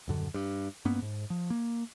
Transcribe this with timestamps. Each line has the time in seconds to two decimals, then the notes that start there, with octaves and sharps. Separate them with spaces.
0.08 D#1 F#2 D3
0.34 G2
0.85 G2 A#3 B3 C#4
1.02 G#2
1.30 F3
1.50 A#3